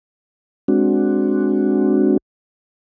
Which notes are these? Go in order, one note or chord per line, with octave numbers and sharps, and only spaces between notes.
G#3 C4 D4 F#4